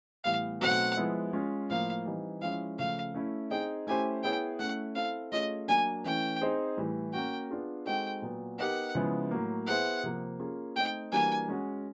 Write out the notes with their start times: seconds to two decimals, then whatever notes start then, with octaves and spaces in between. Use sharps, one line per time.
0.24 A2 E3 G3 B3 F5
0.61 B2 F#3 A3 C4 D#4 F#5
0.97 F3 G#3 B3 E4
1.33 G#3 C#4 F4
1.70 A2 F3 A#3 F5
2.05 E3 G3 C4 D#4
2.41 F3 G#3 C#4 E4 F5
2.78 C#3 F3 A3 F5
3.14 A3 C#4 E4
3.51 C4 D#4 G#4 G5
3.87 A3 C#4 E4 G4 C5 G#5
4.23 B3 E4 G#4 C#5 G5
4.59 A3 C#4 E4 F#5
4.95 C4 E4 A4 F5
5.32 A3 C#4 F4 G#4 C#5 D#5
5.68 F#3 A#3 D4 G#5
6.04 E3 A3 C#4 E4 G5
6.41 C4 D#4 G#4 C5
6.77 A2 E3 G3
7.13 A#3 C#4 F#4 G5
7.50 B3 D4 F4 G#4
7.86 G#3 C4 D#4 F#4 A4 G5
8.22 A#2 F#3 B3
8.58 B3 D#4 G4 A#4 F#5
8.95 C#3 F3 G#3 B3 E4
9.31 A2 F#3 A#3
9.67 B3 E4 G#4 C5 E5 F#5
10.03 C3 F3 A#3
10.40 A#3 C#4 F4 G#4
10.76 A3 C4 D#4 G5
11.12 E3 G3 A#3 D4 F#4 G#5
11.48 G#3 C#4 F#4